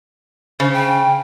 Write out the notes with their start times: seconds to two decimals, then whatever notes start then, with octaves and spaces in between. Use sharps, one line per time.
0.60 C#3 C5
0.73 G5